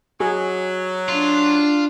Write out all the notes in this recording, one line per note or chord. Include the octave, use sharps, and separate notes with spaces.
F#3 G#4
D4 F4